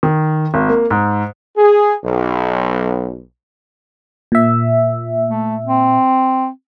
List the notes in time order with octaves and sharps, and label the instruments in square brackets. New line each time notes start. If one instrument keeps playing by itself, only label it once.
[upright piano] D#3
G#1
A#3
G#2
[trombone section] G#4
B1
[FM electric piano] A#2 E5
[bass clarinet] A3
C4